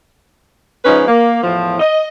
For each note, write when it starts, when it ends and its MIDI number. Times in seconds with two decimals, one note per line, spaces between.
0.85 1.04 53
0.85 1.04 56
0.85 1.04 61
0.85 1.04 63
0.85 1.04 71
1.08 1.39 58
1.43 1.75 40
1.43 1.75 45
1.43 1.75 53
1.79 2.06 75